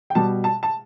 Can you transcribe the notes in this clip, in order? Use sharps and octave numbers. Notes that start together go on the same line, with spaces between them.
G5
B2 G3 A5
A5
A5